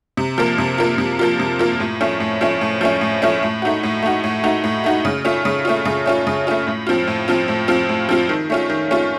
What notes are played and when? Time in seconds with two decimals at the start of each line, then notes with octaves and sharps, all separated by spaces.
0.17 C3
0.38 F3 A#3 F4
0.58 C3
0.78 F3 A#3 F4
0.98 C3
1.19 F3 A#3 F4
1.39 C3
1.59 F3 A#3 F4
1.80 A2
2.01 F3 A3 C#4
2.20 A2
2.41 F3 A3 C#4
2.61 A2
2.81 F3 A3 C#4
3.01 A2
3.22 F3 A3 C#4
3.43 A2
3.62 A3 D#4 F#4
3.83 A2
4.02 A3 D#4 F#4
4.24 A2
4.43 A3 D#4 F#4
4.64 A2
4.84 A3 D#4 F#4
5.05 C#3
5.25 A3 C#4 F4
5.45 C#3
5.65 A3 C#4 F4
5.85 C#3
6.06 A3 C#4 F4
6.27 C#3
6.47 A3 C#4 F4
6.67 A2
6.87 F3 C4 F4
7.07 A2
7.28 F3 C4 F4
7.48 A2
7.68 F3 C4 F4
7.89 A2
8.09 F3 C4 F4
8.29 D#3
8.50 A3 C#4 F4
8.70 D#3
8.91 A3 C#4 F4